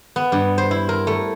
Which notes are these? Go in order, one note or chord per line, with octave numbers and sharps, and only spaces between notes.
B3
G2
C5
E4
A#4
A3